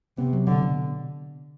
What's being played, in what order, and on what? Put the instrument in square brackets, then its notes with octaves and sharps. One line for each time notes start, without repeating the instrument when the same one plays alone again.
[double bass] C3 [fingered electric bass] B3
[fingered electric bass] F#3
[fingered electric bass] B2 [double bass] D3
[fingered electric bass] B2